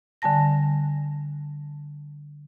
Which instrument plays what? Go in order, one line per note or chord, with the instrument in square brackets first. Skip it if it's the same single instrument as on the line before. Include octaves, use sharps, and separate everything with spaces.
[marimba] D3 G3 G#5 A5 A#6